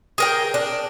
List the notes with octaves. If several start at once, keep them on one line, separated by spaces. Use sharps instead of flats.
G#4 A#4 G5
D4